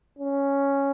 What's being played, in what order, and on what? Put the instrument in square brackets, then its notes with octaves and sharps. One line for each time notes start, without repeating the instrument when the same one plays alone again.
[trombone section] C#4